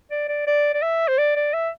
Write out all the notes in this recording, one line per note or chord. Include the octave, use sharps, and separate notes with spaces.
D5
D5
D5
D5
E5
C5
D5
D5
E5